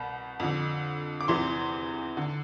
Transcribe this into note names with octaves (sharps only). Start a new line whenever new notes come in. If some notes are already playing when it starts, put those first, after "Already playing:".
Already playing: C2 B2 B5
F2 D3
D6
E2 C3 E3 C6
D3